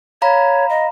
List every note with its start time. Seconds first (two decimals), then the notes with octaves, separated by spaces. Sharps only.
0.22 C#5 F5 A#5 B5
0.69 D#5